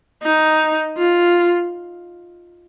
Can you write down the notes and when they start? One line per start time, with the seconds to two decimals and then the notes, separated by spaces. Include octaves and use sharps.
0.23 D#4
0.97 F4